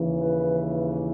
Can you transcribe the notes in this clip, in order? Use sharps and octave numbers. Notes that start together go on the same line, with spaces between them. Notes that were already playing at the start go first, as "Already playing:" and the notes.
Already playing: D#2 C#3 E3
B4